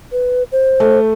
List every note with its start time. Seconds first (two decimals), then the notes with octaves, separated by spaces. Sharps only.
0.12 B4
0.52 C5
0.80 A3